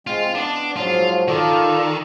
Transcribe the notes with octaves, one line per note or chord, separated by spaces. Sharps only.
G#3 C4 F4
B3 D4
G#2 F3 F#3 F4
D#3 F4 A4 D5